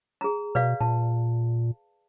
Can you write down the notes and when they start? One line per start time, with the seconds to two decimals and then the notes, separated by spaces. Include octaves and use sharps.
0.21 G#4 A#5
0.55 B2 B4 D5 F5
0.80 A#2 A5